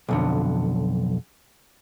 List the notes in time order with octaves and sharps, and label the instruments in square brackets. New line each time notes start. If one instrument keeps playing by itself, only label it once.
[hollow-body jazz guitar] B1 F2 D3